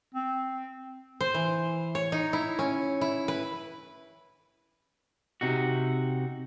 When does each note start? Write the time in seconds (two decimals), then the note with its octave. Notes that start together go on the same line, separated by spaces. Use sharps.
0.15 C4
1.21 C5
1.34 E3
1.95 C#5
2.12 D#4
2.33 E4
2.59 C#4
3.01 E4
3.28 B4
5.41 C3 D#4 F#4